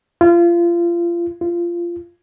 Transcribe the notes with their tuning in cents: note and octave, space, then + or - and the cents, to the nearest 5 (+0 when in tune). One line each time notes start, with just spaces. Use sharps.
F4 -30
F4 -20